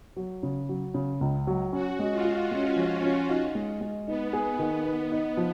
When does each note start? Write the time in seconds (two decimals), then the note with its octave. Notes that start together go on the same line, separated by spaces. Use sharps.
0.17 F#3
0.43 C#3
0.69 F#3
0.94 C#3
1.21 C#2
1.47 F#3
1.73 C#4 F#4
1.99 G#3
2.12 F4
2.24 F4
2.51 G#3 C#4
2.76 F3
3.03 C#4
3.29 D#4
3.55 G#3
3.81 G#3
4.07 B3 D#4
4.33 G#4
4.59 D#3
4.84 D#4
5.12 D#4
5.37 F3